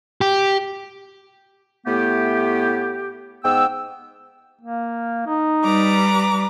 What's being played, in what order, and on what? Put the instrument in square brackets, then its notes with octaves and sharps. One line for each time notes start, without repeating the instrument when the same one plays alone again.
[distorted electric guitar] G4
[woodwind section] A2 A3 B3 G4
G#2 B3 G5 E6
[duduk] A#3
D#4
[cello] G3 [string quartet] B4 A#5 D6